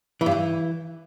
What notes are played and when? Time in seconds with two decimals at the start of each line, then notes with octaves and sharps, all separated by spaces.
0.21 E3
0.26 G2
0.31 E3